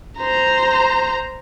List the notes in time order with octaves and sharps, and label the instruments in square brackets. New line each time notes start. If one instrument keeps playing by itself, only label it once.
[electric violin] C5 A#5